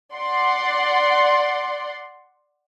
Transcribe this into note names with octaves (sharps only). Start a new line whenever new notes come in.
D5 F#5 C6